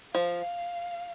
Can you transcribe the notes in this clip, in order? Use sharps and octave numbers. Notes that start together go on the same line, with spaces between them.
F3 F5